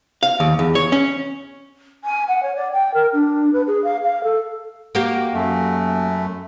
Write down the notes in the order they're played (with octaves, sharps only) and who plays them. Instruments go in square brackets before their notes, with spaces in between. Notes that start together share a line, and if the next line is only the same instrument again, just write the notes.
[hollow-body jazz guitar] F5
D#2
E2
C#5
C#4
[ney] G#5
F#5
C#5
D5
G5
A#4
D4
B4
G#4
F5
F5
A4
[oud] A#3 F#4 G4
[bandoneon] F#2 A3